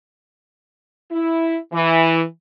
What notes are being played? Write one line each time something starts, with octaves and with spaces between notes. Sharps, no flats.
E4
E3